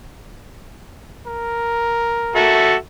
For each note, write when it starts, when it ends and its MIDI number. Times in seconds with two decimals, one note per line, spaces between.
1.27 2.64 70
2.36 2.74 66
2.36 2.74 69
2.36 2.74 76